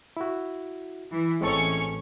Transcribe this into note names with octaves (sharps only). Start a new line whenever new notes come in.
E4 F#4
E3
A1 G#3 C4 C#4 A4 C#6